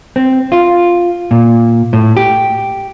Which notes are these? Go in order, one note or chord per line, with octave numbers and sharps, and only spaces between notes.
C4
F4
A#2
A2
G4